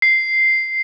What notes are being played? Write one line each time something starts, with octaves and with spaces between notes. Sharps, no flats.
C7